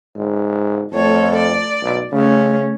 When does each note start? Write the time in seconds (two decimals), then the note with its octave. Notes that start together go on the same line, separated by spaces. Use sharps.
0.16 G#2
0.92 F2 A3 A4 C#5
1.36 D5
1.82 B1
2.12 C#3 A3 C#4